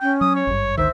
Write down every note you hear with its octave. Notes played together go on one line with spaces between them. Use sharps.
C#4 G5
F#3 D#6
C#5
G#1 G2
G#1 D2 D#3 C5 E5